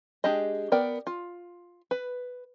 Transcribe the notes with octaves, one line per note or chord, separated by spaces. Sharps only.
G#3 D4 G4 G#4 D#5
B3 A#4 D5 G5
F4
B4